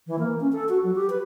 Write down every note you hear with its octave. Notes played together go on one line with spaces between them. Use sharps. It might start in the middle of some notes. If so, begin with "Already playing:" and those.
E3
A#3
C#4
A4
F#4
F#3
G4
B4